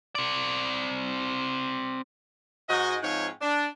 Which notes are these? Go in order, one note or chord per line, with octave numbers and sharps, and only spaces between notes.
C4 D5
G#2 F#4 D#5
G#2 F3 C4 D#4 C#5 F5
D4